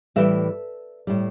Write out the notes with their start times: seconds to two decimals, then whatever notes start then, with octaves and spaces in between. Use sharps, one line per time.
0.16 A2 E3 G3 E5
1.07 A2 G3